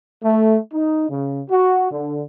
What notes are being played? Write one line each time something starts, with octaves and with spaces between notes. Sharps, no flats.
A3
D#4
C#3
F#4
D3